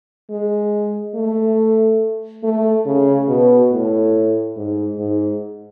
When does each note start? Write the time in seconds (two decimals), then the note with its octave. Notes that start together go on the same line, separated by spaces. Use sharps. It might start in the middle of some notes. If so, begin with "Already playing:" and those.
0.30 G#3
1.15 A3
2.44 A3
2.86 C#3
3.29 B2
3.71 A2
4.56 G#2
4.99 G#2